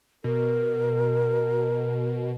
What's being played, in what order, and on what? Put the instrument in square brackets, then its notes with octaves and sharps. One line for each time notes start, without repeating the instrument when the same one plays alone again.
[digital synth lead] B2 [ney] A#4